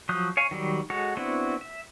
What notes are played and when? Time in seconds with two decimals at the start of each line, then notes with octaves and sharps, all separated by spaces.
0.09 F3 F#3 D#6 F#6 G6
0.37 C#5 F5 G#5
0.51 D#3 F#3 G3
0.90 G#3 F#4 A4 C#5
1.17 B3 C4 D4 E4 F#4
1.61 E5